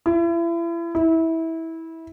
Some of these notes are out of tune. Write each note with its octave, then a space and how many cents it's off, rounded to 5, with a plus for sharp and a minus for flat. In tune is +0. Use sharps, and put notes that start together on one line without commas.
E4 +35
E4 -20